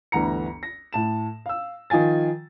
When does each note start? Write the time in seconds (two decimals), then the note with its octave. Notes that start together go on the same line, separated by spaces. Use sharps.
0.12 G1 D2 E3 F#5 A#5 C#7
0.63 A#6
0.93 A2 A5 E7
1.46 F5 E6
1.90 D#3 F3 F4 G#5 A6